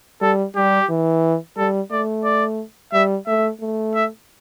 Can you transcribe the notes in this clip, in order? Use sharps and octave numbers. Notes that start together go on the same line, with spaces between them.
G3 A4
G3 G4
E3
G3 A4
A3 D5
D5
G3 E5
A3 E5
A3
E5